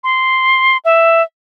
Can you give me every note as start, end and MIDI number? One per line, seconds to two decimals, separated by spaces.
0.04 0.77 84
0.85 1.22 76